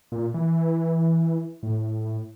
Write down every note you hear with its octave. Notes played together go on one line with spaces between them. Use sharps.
A#2
E3
A2